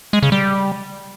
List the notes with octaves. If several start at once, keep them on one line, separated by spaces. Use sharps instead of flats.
G#3
C#3
G3